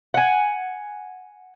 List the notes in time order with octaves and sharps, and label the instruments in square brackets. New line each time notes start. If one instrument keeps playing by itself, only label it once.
[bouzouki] F#5 G#5